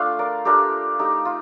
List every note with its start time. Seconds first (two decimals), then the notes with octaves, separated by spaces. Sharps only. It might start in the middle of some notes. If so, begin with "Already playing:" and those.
Already playing: A3 D4 F4 F5
0.19 A#4 D5
0.45 A3 D4 F4 G4 A#4
0.99 A3 D#4 G4
1.25 F4